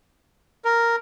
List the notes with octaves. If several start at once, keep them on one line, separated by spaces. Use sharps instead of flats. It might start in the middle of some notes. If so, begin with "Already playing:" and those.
A#4